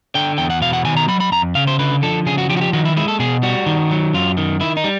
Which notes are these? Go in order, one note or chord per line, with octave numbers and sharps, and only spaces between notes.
D3 G5
E2 G5
F#5
B2 F5
F#5
D#3 G#5
A#5
F#3 B5
B5
F2 A#5
C#3 F5
C5
D3 B4
F3 A4
C#3 G#4
F#4
F3 G4
F#4
G4
D#3 F#4
E4
G#3 E4
A4
B2 G#4
G3 F#4
D#3
F#3
F#2 F4
D#3
D#3 E4
D#4
G3